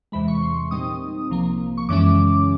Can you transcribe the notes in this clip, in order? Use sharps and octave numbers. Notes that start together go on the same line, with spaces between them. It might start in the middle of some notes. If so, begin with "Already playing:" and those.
E2 C3 E3 G#3 B5
C#6
C6
A#2 G3 C4 D#4 D#6
C2 C3 F3 A#3
C#6
F#2 C#3 E3 G#3 C#4 D6